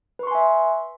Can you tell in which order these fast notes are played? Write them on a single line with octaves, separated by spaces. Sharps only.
B4 C#6 C6 G#5 E5